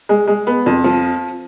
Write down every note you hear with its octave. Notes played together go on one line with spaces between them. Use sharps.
G#3
G#3
B3
F2
F3